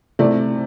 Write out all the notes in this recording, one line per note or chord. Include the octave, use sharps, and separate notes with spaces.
C3 A3 E4 D5